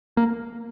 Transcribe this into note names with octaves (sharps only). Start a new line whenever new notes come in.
A#3